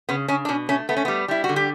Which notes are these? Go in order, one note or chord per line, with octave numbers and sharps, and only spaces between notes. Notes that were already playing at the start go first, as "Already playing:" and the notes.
C#3 B3
C#3 C#4
D4
B2 C#4
A3 C#4
A3 B3
C#4
G3 B3
G3 E4
F#4
D3
G4